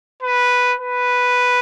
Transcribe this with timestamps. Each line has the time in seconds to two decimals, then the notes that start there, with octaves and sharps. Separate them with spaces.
0.23 B4
0.80 B4